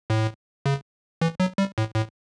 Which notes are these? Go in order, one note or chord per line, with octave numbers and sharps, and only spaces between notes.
A2
C#3
E3
F#3
G3
A2
A2